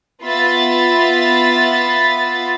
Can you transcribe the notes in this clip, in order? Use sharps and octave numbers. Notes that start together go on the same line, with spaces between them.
B3 F4 E5 B5 A6